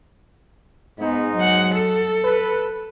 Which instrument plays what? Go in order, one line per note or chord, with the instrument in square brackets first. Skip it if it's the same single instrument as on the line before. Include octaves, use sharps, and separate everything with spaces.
[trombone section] G#2 G#3 D#4 [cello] B3
[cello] F#3 F#5
A4
[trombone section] B4